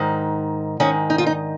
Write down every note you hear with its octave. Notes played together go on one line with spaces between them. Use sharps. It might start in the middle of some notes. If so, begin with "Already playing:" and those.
Already playing: G#2 D#3
G#2 D#3 C#4
D#4
F4
D#4